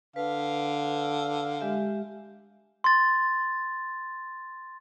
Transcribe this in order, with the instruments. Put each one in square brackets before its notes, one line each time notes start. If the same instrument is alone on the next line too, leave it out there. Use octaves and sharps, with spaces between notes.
[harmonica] D3 F5 [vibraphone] B4
[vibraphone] G#3 G4 E5
[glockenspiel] C6 A6